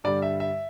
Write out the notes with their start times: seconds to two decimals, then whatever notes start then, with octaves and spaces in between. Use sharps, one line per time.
0.04 G2 D3 G3 D5
0.22 E5
0.40 E5